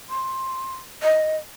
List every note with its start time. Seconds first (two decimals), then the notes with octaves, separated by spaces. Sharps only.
0.09 C6
1.03 D#5